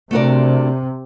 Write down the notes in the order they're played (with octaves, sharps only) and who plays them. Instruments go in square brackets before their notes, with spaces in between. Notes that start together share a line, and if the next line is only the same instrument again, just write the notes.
[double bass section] C3 [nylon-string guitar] A3 D4 F#4 A#4 D5